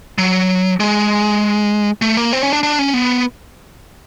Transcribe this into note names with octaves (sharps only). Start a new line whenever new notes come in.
F#3
G#3
A3
A#3
C4
C#4
D4
D4
C#4
B3